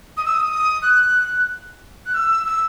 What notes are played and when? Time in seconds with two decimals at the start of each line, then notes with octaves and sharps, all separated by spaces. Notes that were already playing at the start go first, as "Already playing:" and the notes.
0.17 D#6
0.25 E6
0.34 D#6
0.82 F#6
2.06 F#6
2.14 E6
2.46 E6